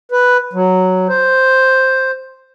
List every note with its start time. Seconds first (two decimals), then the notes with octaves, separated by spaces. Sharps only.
0.12 B4
0.53 F#3
1.09 C5